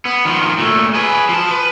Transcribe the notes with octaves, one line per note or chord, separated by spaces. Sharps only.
B3
D#3 F3
A#2 A3
G#4 B4
F3 A5
B4